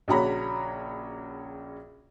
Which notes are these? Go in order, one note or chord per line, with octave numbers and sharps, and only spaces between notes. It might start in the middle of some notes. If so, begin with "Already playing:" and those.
A#1 C#3 F#4 C#5 A#5 B5